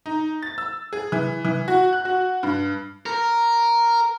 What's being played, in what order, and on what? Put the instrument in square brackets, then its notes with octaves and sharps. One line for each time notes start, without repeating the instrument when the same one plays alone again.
[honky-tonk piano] D#4
A6
E6
G#4
E3
E3
F#4
F#6
F#4
G2
[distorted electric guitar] A#4